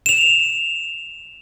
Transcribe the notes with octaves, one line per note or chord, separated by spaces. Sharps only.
E7 F7